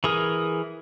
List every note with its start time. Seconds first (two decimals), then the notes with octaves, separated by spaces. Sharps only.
0.04 E3 G#4 A#4